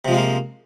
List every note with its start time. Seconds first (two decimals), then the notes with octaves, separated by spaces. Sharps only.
0.05 C3
0.08 F3
0.11 G#3
0.14 F4
0.17 A#3